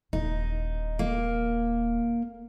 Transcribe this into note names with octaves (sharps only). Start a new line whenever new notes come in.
D#1 D#4
A#3